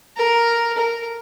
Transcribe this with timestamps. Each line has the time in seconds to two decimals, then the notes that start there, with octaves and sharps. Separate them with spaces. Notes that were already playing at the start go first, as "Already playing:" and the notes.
0.17 A#4
0.78 A#4